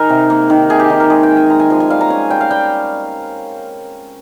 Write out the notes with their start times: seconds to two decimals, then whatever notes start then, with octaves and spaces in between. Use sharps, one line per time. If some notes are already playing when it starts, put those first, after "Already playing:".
Already playing: D#3 D#4 G#4 A#4
0.09 C3
0.30 A#3
0.50 D#3
0.70 C3 G#4
0.80 G4
0.90 D#3
1.00 A#4
1.10 G#3 G#4
1.23 G5
1.31 G#3
1.37 G#5
1.50 G#3 A#5
1.60 G#5
1.70 F3 G#5
1.80 G#5
1.90 G3 F5
2.01 A#5
2.10 C#4 G#5
2.30 G3 G5
2.41 F5
2.51 G3 G5